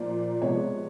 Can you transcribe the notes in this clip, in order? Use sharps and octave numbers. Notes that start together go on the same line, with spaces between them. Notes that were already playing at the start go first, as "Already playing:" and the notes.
Already playing: A#2 F3 A#3 D5
C3 F3 G#3 B3 C#5